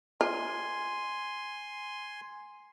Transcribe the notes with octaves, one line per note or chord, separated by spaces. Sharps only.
F4 G#5 C6